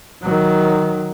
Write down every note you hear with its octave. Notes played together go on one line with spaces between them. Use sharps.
D#3 F#3